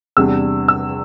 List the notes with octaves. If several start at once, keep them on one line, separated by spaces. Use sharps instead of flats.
E2 C3 G3 D4 E6
E6